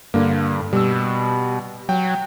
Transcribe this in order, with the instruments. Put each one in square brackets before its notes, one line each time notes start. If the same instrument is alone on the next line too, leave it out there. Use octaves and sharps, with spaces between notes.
[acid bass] G2 [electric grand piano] D3 A#3
[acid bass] B2 [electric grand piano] G3 E6
[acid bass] F#3 [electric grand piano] G5